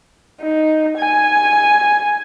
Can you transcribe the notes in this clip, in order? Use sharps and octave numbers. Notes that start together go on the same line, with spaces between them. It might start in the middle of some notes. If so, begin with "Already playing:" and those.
D#4
G#5